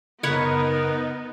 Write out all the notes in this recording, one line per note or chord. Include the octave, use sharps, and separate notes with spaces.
F#2 C#3 B3 D#4 A#4 B4 C#5 F#5